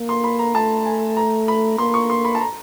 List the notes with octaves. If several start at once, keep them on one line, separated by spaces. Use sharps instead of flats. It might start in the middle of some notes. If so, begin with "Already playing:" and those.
Already playing: A#3
C6
B5
A#5
A3 A5
G#5
A#5
B5
A#3 C6
C#6
C6
B5
A5
A#5